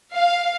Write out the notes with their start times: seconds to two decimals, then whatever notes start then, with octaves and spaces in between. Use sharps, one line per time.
0.14 F5